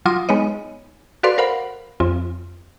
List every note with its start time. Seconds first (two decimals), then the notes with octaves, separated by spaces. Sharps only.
0.05 F#3 F4 C6 D6 D#6 A#6
0.29 G#3 B3 D#4 C#5 D#5
1.23 F#4 A4 B4 D5 F5 C6
1.38 A#4 C5 F5 F#5 B5
2.00 F2 C4 F4